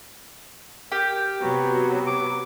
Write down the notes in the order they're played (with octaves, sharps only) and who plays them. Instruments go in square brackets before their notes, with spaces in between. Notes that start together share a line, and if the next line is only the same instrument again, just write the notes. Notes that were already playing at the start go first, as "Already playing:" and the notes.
[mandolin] G4 [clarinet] A#4
[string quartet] C3 F#3 B3 [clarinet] F#4
[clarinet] D6